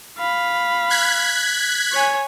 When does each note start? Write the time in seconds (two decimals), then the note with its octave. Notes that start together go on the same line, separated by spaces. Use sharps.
0.19 F5 B5
0.90 F#6 G#6 B6
1.93 C#5 G#5